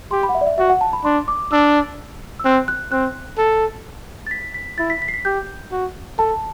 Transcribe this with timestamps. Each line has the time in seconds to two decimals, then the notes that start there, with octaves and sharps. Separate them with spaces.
0.11 G4 C6
0.23 B5
0.29 F#5
0.35 E5
0.41 D5
0.47 E5
0.58 F#4 E5
0.70 F#5
0.81 A5
0.93 B5
1.05 D4 C6
1.28 D6
1.52 D4 E6
2.40 E6
2.45 C4 F#6
2.68 F#6
2.92 C4 F#6
3.38 A4
4.27 A6
4.31 B6
4.54 B6
4.78 E4 A6
4.90 B6
5.02 B6
5.08 C7
5.14 B6
5.25 G4 G6
5.72 F#4
6.18 A4 A5